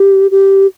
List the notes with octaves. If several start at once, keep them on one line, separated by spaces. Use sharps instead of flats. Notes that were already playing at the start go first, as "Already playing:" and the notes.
Already playing: G4
G4